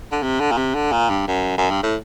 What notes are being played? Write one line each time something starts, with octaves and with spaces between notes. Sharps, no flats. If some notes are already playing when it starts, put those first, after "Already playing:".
D3
C3
D3
A#2
C3
D3
A#2
G2
F#2
F#2
G2
A2